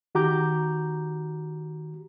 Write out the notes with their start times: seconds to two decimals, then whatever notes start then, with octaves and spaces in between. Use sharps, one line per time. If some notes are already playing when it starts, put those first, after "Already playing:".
0.15 D#3 F#4 G4 A#5 D6 G6